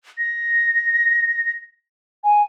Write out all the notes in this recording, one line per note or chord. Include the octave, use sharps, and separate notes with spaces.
A#6
G#5